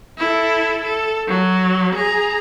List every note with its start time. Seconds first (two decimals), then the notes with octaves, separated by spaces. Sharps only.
0.18 E4 A4
0.84 A4
1.27 F#3
1.95 G#4 A#5